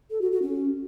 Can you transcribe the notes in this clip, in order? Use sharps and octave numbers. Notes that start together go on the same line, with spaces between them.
A4
F#4
F#4
C#4